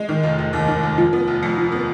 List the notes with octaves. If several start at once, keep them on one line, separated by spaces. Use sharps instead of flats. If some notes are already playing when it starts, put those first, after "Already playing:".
Already playing: G#3
D#3
F1
F1
D#2
D#3
F1
F3
B3
F1
F2
F3
B3